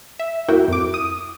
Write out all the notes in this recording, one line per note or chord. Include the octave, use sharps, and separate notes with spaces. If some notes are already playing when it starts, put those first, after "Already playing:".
E5
D#2 A#3 E4 F#4 G5
F2 D6
D#6